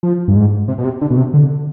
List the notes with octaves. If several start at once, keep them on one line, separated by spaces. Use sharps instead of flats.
F3
G2
G#2
C3
B2
C3
D3
B2
C3
D3